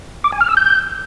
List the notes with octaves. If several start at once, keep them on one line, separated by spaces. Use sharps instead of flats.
D6
G#5
F6
E6
G6